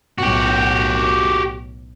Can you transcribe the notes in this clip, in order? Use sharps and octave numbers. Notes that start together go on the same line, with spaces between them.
B1 A2 F#4 G4